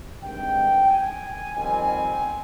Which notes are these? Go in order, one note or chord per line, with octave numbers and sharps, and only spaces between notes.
G2 D#3 G#3 C4 G5
G#5
F2 D#3 G3 C4 G#5